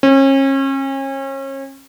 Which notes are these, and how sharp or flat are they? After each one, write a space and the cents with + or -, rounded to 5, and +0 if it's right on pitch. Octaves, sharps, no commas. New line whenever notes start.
C#4 -35